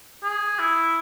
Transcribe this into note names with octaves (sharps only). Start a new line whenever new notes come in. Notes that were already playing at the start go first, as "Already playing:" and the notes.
G#4
E4